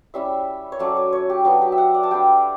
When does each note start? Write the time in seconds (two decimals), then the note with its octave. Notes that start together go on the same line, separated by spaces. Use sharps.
0.14 G3 C#4 E4 E5
0.72 C#5
0.79 F#3 A3 C#4 D5
0.97 C#5
1.13 C#5
1.29 G4
1.45 F#3 B3 D4 F#4
1.62 G4
1.72 E5
1.78 F#5
1.94 D5
2.03 A5
2.11 G3 D4 G5